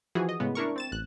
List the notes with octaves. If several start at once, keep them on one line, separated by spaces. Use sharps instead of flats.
E3 F3 F#4 G#4
D#5
A2 C#3 G#3 B3
D4 E4 A#4 C#6
C4 A6 E7
A1 F#6